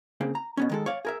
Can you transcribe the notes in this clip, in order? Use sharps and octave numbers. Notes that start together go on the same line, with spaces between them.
C#3 A#3 C4
A#5
B2 B3 C#4
D#3 G#3 A4
C#5 D5 F5
G#4 A#4 E5